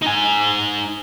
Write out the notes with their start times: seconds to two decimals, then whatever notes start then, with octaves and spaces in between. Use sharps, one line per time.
0.02 D#4 G#5